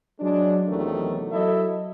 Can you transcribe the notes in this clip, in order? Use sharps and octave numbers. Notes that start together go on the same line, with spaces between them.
F#3 G#3 D4
E2 C3 D#3 F#3 A3
F#3 E4 A4 D#5 E5